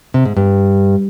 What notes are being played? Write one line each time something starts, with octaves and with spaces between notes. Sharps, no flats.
C3
G#2
G2